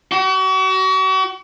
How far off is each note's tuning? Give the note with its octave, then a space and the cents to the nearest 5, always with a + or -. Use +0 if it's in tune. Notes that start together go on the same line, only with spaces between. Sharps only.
F#4 +40